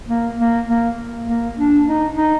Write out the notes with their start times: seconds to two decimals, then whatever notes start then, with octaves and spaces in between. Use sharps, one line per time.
0.08 A#3
0.38 A#3
0.68 A#3
1.27 A#3
1.58 D4
1.87 D#4
2.17 D#4